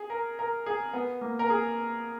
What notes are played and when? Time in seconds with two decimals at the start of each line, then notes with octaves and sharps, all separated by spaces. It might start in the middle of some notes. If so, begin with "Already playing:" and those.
Already playing: G#4
0.10 A#4
0.39 A#4
0.66 G#4
0.93 B3
1.21 A#3
1.39 A#4
1.50 G#4